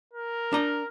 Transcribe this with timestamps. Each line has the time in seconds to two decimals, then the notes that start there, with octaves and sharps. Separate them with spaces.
0.13 A#4
0.53 D4 A#5